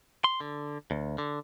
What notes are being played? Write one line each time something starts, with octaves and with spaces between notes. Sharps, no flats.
C6
D3
D2
D3